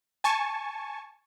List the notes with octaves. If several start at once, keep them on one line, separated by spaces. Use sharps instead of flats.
G#5 A5 C#6